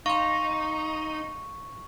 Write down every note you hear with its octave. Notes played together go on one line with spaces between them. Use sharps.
D#4 F5 C6 C#6